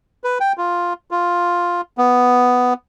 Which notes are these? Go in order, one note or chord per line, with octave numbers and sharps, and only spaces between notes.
B4
G5
F4
F4
B3